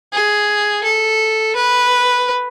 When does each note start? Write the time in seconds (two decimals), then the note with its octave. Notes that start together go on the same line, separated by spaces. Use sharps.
0.13 G#4
0.84 A4
1.56 B4